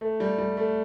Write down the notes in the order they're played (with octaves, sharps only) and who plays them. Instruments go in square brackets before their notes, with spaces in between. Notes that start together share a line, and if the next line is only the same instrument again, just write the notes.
[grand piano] A3
G3
G3
A3